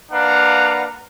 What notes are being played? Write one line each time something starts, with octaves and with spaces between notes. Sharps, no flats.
A#3 D4 B4 F5 F#5 A#5